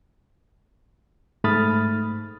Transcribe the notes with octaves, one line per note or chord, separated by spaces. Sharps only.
G#2 A3 B5 D#6 F6 A6